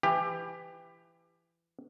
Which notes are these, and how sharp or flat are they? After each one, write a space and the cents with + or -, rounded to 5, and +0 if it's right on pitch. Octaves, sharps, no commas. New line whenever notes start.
E3 +25 G4 +20